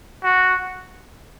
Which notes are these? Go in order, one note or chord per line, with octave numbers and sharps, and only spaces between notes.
F#4